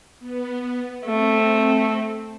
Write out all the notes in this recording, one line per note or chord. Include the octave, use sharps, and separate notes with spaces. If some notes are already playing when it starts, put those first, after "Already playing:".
B3
A3 C4